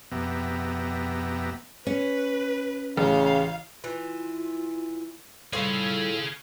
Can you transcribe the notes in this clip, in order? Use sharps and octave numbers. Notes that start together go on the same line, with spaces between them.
F2 B2 B3 G4 E5 A#5
C#4 B4
A1 C#3 F5
E3 F4
A2 G3 F4 G#4 A4 F5